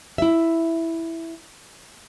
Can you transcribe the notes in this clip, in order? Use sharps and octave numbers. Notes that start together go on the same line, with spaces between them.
E4 E5